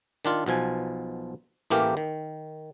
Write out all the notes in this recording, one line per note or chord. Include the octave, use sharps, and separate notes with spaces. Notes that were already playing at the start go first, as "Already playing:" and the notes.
D#3 D4 F4
B1 B2 F3 G#5
A1 E3 A3 A#3 G4 A#4
D#3